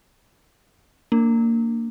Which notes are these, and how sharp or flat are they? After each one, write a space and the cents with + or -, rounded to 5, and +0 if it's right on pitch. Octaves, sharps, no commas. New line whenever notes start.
A#3 -20 D4 +0